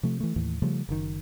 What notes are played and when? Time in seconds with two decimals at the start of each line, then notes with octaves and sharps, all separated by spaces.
0.03 C3 F3 A3
0.20 E3 A3
0.36 D#2 A2 E3
0.62 C#3 F3 G3 A3
0.89 F#1 D#3